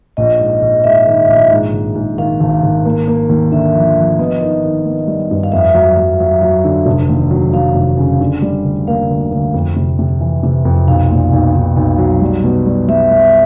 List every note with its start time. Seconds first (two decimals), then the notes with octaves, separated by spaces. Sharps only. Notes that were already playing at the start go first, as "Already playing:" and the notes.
0.17 A#1 D#5
0.40 G#2
0.62 A#1
0.84 G#2 E5
1.07 D#3
1.28 A#1
1.51 G#2
1.73 G#1
1.95 G#2
2.18 D#3 F5
2.40 G#1
2.63 G#1
2.85 A#3
3.08 A#3
3.29 D#2
3.52 D3 E5
3.75 F3
3.97 F3
4.19 B3 D#5
4.41 D#3
4.64 D#3
4.86 B3
5.07 G3
5.31 G2
5.44 F5
5.52 F2 E5
5.74 F#3
5.97 F#3
6.20 F#3
6.42 F#3
6.64 D3
6.86 F1
7.09 D#2
7.31 F#3
7.53 F#3 F5
7.75 F1
7.97 C#3
8.21 D3
8.42 G3
8.65 D2
8.88 A#3 F5
9.10 D2
9.31 D2
9.54 F2
9.76 C3
9.99 C3
10.21 E3
10.43 C3
10.65 F2
10.88 B1 F5
11.10 A#2
11.33 B1
11.55 B1
11.76 B1
11.98 F#3
12.22 G3
12.44 B2
12.66 G3
12.88 G3 E5
13.11 G3